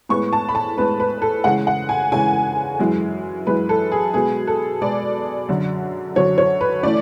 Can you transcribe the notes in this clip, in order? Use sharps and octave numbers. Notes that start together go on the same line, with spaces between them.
A2 G#3 B3 C#6
A5
B5
A5
A2 G#3 B3 B4
B4
A4
C#3 E3 G#3 F#5
F#5
G#5
C#3 E3 G#3 G#5
F#2 E3 G#3
F#2 E3 G#3 B4
A4
G#4
B2 G#3 B3 G#4
A4
B2 G#3 B3 D5
F#2 D3 F#3
F#2 D3 F#3 C#5
C#5
B4
E3 A3 C#4 D5